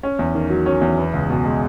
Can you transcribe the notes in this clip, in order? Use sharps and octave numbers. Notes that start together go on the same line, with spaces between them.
C#4
E2
D#3
F#3
C#4
E2
B3
C#2
B2
G#3